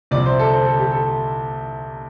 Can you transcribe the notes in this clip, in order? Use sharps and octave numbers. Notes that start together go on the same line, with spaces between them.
C2 C3 F3 D5
C5
A4
C5
A4
G4
A4